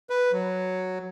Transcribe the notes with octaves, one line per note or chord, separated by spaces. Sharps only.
B4
F#3